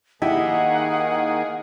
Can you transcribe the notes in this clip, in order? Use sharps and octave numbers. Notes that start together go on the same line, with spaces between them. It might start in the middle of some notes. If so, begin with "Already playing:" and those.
D#3 A#3 D#4 E4 G4 G#4 D#5 F#5